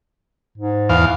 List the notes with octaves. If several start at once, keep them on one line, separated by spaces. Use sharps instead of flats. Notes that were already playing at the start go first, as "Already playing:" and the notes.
G#2
E2 F5